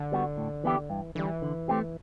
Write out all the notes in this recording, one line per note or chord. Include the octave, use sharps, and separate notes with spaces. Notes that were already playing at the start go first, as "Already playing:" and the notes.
Already playing: D3
G3 B3 F#4
A2
E3 B3 E4 G4
G2 E3
D3 E3 G3
D3
A3 C4 G4